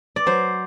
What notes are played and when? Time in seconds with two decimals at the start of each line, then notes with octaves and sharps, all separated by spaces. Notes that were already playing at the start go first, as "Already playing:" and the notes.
0.16 D5
0.26 F#3 C5